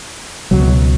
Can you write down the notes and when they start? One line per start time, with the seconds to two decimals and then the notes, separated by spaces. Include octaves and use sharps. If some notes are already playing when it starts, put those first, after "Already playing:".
0.51 C#2 B2 F#3